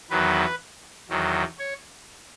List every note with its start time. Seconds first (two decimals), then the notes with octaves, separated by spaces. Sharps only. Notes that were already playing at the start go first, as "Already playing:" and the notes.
0.10 E2 D#3 F#3 B4
1.09 E2 D#3 F#3
1.59 C#5